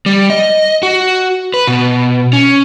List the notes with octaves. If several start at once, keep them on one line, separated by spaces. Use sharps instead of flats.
G3
D#5
F#4
B4
B2
C#4